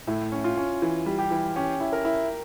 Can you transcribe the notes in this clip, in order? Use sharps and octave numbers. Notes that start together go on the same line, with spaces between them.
A2 E4
C#4
F4
C#4
E3
G3
G4
E3
C#4 G4
E4
A#4
E4